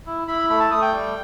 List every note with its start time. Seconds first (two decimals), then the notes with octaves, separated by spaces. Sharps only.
0.07 E4
0.28 E4 B5
0.50 A3 B5
0.60 A5
0.71 A3 D#6
0.82 G5
0.93 G3